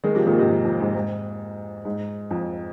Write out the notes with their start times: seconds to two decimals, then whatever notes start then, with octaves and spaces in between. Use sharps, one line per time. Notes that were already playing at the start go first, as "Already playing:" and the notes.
0.04 D#3 G#3
0.15 C3 F3
0.26 A#2 D#3
0.38 G#2 C3
0.49 F2
0.65 F2
0.80 G#2
0.95 G#2
1.85 G#2
2.31 F2